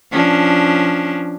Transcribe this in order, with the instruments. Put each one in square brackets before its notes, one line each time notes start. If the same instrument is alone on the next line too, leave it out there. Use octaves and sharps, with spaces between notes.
[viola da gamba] F3 C#4 D4